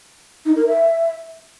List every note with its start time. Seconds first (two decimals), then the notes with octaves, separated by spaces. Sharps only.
0.45 D#4
0.56 A#4
0.67 E5